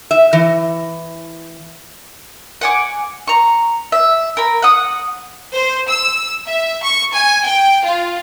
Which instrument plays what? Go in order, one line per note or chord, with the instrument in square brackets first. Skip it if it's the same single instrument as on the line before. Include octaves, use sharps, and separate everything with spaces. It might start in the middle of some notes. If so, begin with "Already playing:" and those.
[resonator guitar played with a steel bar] E5
E3
[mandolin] F#5 G#5 D6
A#5 C#6
E5
A#4 B5
F#5 D#6
[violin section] C5
E6
E5
C#6
G#5
G5
F4